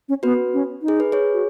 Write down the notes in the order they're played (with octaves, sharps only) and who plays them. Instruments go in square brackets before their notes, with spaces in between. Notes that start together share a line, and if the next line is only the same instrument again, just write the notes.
[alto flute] C#4
[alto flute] B3 [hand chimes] F#4 B4
[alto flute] C#4
D#4
[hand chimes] G#4
B4
G#4 C#5
[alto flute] F#4